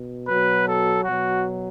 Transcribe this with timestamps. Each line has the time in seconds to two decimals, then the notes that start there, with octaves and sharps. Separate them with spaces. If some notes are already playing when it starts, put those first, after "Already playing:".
Already playing: B2
0.27 B2 F#3 B4
0.66 A4
1.04 B2 F#3 F#4